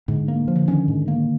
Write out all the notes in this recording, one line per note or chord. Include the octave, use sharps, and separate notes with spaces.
G#2 D3
A#3
F3
D3
D#3 C#4
G#2
A#3